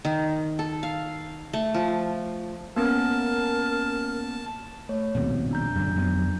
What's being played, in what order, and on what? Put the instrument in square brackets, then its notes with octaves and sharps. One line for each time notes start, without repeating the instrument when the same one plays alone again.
[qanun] D#3
A4
F5
A3
F3
[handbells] A#3 B3 C#4 [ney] A#4 [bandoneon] A5
[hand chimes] A3 C#5
[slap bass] A#1 D#2 B2 [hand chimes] B3 C4
[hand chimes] D4 A#5 G6
[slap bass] F#2 D3
F2 F#3 B3